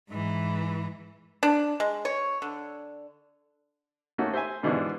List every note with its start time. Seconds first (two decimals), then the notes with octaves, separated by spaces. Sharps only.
0.10 G#2 E3
1.43 D4
1.80 G#3
2.05 C#5
2.42 D3
4.18 A3 A#3 C#4 D#4 F#4
4.34 C5 E5 G#5
4.63 G#2 B2 D3 E3 D4 E4